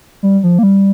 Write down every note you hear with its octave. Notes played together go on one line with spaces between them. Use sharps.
G3
F3
A#3
G3